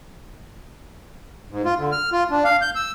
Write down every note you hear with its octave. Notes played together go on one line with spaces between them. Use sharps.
G#2
F4
D3
F6
F4
D4
F5
G6
E6